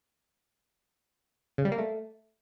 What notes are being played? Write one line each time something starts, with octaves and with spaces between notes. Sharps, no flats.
C#3
G3
A#3
A3